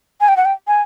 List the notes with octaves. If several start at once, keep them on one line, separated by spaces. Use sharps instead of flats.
G#5
G5
F#5
G5
G#5